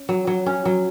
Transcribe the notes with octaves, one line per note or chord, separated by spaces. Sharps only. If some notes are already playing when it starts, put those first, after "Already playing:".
Already playing: C#4
F#3
F#3
C#4
F#3